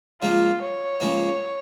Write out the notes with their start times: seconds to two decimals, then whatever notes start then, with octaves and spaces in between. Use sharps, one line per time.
0.21 C#2 C#3 F3 A#3 F4
0.62 C#5
1.00 C#2 C#3 F3 A#3